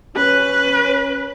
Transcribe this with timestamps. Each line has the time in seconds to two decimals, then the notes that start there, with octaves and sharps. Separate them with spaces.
0.16 C#4 B4